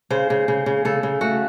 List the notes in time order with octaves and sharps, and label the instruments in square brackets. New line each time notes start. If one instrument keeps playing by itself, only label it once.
[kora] C#3 C5
C#3
C#3
C#3
C#3 A4
C#3
A3 F#4